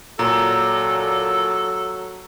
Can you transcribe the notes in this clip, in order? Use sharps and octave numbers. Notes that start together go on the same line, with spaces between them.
A#2 F#3 A4 A#5